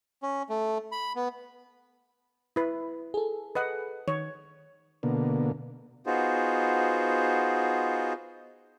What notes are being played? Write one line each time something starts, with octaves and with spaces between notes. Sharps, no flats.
C#4
A3
B5
B3
E4 B4
G#4 A4
B4 D#5 F#5
D#3 C#5
B2 D3 A#3
B3 D#4 F4 F#4 G#4 C5